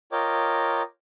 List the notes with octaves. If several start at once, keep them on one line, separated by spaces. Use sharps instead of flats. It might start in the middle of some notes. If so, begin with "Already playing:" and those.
F4 A#4 C#5 D#5 G5 D6